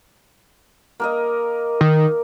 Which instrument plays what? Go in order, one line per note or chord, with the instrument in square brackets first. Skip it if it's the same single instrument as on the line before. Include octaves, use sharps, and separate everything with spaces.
[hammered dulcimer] A#3 A#4 D#5
[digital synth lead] D#3